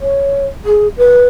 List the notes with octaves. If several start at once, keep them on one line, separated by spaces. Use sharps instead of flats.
C#5
G#4
B4